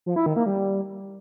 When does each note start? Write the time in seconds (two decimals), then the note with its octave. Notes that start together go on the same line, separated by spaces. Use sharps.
0.06 F3
0.16 E4
0.26 D#3
0.36 A#3
0.46 G3